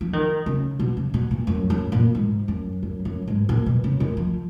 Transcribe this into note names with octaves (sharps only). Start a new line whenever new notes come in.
F3
D#3
C#3
B2
C#3
B2
A#2
F#2
F#2
A#2
G#2
F#2
F#2
F#2
G#2
A#2
B2
C#3
D#3
F3